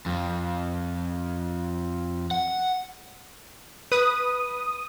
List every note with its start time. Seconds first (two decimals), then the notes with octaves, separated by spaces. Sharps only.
0.06 F2
2.31 F#5
3.92 B4 D#6